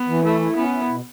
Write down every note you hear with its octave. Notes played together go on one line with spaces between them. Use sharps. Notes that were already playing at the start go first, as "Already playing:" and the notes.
Already playing: B3
E3
A3 E4
E4
B3 C#4
E4
B2